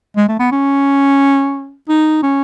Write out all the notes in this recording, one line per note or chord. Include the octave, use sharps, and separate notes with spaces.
G#3
A3
B3
C#4
D#4
C#4